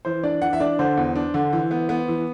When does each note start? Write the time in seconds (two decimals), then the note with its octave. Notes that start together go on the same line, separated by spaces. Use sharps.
0.05 E3 C5
0.23 D4 D5
0.42 E3 F#5
0.53 E5
0.60 D4 D5
0.79 D3 C5
0.97 E2
1.16 D4
1.34 D3
1.53 E3
1.71 B3
1.89 B3
2.08 E3